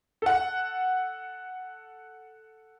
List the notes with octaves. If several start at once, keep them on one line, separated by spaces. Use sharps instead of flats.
A4 F#5